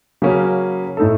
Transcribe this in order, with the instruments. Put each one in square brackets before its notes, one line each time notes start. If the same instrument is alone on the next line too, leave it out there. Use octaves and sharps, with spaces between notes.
[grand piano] C#3 F#3 A#3 C#4
A2 A3 D#4 A4